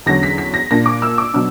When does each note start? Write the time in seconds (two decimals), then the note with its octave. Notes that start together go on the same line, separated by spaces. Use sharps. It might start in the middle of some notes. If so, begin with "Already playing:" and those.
0.06 E2 D3 F#3 C#4 A#6
0.23 B6
0.38 B6
0.54 A#6
0.71 A#2 A#3 D4 A#6
0.86 D6
1.02 E6
1.18 D6
1.33 B2 F#3 B3 D4 E6